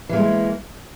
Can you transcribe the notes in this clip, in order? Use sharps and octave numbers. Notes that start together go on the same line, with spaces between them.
E3 G#3 A#3